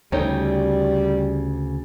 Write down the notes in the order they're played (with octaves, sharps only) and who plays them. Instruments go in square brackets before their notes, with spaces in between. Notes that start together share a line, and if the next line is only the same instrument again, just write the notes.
[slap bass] D2 [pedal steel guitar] C#3 G5 [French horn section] G3 [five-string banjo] A3 D#4 C#5